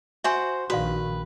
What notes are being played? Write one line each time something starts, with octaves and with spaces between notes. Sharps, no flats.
F#4 C5 E5 G#5
A#1 D#3 F#4 B4 D5 F5